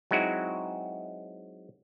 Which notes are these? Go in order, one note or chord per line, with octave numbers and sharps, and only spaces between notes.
F#3 G#3 C4 D#4 E4 F#4